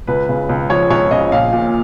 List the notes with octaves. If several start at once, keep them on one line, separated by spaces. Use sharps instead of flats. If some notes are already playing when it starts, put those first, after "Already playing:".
C#2 B4
C#3
C#2
F3 C#5
C#2 C#5
C#3 D#5
A#1 F5
A#2